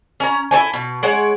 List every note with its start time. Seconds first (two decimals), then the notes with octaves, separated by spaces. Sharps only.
0.20 C#4 A#5
0.51 E4 A4 C#5 G#5
0.74 B2
1.03 G#3 C#5 F#5